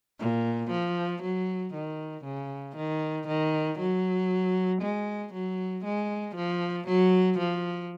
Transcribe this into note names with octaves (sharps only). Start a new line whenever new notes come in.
A#2
F3
F#3
D#3
C#3
D#3
D#3
F#3
G#3
F#3
G#3
F3
F#3
F3